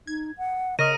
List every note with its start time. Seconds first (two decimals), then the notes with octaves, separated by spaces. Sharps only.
0.07 D#4 G#6
0.38 F#5
0.79 C#3 A#4 D#5 D#6 A#6 D#7